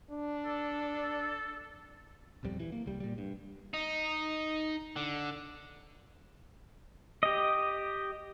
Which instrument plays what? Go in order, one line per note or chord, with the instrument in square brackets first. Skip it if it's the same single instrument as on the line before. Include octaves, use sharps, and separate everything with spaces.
[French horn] D4
[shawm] A4
[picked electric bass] D#1 B1 F2 G3
E3
A#3
C2 G3
A#2 G3
G2
[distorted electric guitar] D#4
D3
[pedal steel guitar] G4 D#5